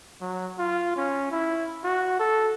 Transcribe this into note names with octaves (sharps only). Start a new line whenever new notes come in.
F#3
F4
C#4
E4
F#4
A4